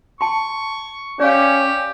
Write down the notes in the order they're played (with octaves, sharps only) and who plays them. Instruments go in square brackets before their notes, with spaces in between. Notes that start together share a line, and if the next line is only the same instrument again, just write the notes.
[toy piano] A5 C6 [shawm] C#6
[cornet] C#4 [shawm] G4 [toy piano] D5 F5